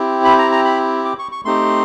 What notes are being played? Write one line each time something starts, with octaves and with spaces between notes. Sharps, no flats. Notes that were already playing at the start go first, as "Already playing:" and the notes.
Already playing: C4 E4 G4
B5
A#5
A#5
B5
D6
C#6
C#6
A3 C4 D#4 G4 C6